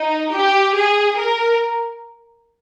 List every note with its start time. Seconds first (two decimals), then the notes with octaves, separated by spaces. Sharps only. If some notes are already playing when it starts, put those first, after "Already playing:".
Already playing: D#4
0.33 G4
0.75 G#4
1.17 A#4